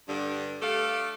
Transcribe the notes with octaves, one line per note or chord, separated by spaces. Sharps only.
G2 D3
A3 G4 A4 F5